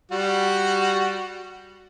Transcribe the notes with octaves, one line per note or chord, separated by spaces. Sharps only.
G3 F#4